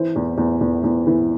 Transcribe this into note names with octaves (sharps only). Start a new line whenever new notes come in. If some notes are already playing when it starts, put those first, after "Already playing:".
Already playing: E3 C5
E2
E2
E2
E2
E3